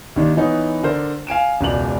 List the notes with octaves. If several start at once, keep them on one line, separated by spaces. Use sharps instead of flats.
D#2 D#3 D4
E3 B3 C#4 D#4
D3 A#4 C5 D5
F5 G#5 D7 E7
E1 C#2 C#3 D5 F7 F#7